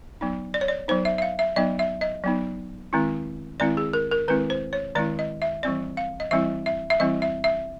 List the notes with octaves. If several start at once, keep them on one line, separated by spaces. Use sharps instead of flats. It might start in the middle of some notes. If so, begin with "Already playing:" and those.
F#3 B3 D#4
D5
C#5
D5
F#3 B3 D#4 C5
E5
E5
F5
E5
F#3 B3 D#4 D#5
E5
D#5
F#3 B3 D#4
D#3 G#3 C4 E4
D#3 G#3 C4 E4 D5
G#4
A#4
A#4
D#3 G#3 C4 E4 B4
C5
C#5
D#3 G#3 C4 E4 D5
D#5
E5
E3 G3 C4 E4 D5
F5
D#5
E3 G3 C4 E4 E5
E5
E5
E3 G3 C4 E4 D#5
E5
E5